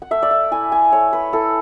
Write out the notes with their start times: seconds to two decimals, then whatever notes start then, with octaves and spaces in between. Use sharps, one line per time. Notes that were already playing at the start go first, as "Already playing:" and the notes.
0.02 F#5
0.11 A3 E5
0.23 D5
0.31 E5
0.51 E4 G#5
0.72 G#5
0.92 A3 C#5
1.13 B4
1.33 E4 A4